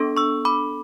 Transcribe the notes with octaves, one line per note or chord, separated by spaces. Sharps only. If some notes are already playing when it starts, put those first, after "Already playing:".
Already playing: B3 D4 A4
C#6 E6
B5 D6